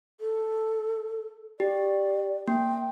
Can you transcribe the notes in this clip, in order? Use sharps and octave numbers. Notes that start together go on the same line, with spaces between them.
A4
G4 D5
A#3 G5